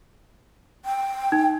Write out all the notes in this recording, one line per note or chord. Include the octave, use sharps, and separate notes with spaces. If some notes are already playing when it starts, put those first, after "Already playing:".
G5
D#4